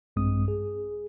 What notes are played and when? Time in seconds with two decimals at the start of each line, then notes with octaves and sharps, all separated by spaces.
0.16 A#1 G2 G#3 C4 D#6
0.48 G#4